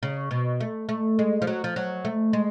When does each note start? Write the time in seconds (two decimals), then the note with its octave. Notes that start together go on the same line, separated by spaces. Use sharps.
0.03 C#3
0.31 B2
0.60 A3
0.89 A3
1.19 G#3
1.42 F3
1.47 F#3
1.64 F3
1.76 F#3
2.05 A3
2.33 G#3